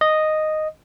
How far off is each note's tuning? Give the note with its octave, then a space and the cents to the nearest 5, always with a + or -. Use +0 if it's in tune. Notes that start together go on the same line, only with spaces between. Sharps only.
D#5 -5